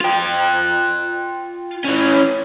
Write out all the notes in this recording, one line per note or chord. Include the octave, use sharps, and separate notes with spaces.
F4 G5
E3 C#4